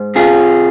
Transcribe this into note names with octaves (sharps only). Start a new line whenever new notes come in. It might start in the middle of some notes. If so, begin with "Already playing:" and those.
Already playing: G#2
C3 F4 G#4